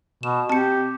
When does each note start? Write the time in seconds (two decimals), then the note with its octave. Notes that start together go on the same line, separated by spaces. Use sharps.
0.23 B2 E7
0.50 C4 G4 A5 C#7